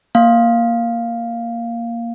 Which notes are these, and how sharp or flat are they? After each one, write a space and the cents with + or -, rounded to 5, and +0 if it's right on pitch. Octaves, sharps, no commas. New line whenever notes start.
A#3 +0 F5 +0